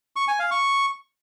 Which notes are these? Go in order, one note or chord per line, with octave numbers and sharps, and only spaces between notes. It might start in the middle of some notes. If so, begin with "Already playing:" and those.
C#6
G#5
F5
C#6